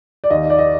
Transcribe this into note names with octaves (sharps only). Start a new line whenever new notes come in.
D5
D#2 D#5
D5
D#5